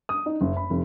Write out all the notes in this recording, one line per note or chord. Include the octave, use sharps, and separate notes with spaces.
D#6
D#4
F#1
B5
F1